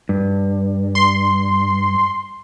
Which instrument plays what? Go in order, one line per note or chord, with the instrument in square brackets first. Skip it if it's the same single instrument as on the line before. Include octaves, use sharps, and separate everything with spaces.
[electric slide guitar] G2
[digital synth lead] C6